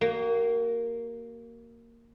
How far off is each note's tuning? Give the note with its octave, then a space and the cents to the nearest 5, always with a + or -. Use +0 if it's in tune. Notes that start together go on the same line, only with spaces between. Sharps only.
A#3 -5 F#4 +40